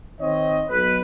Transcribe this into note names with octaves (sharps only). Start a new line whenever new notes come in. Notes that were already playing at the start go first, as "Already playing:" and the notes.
D#3 C4 C#5 D#5
B1 B4